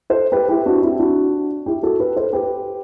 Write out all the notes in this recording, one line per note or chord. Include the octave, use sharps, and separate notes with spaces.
A4 C5
G4 B4
E4 G4
D4 F#4
C4 E4
D4 F#4
E4 G4
F#4 A4
G4 B4
A4 C5
G4 B4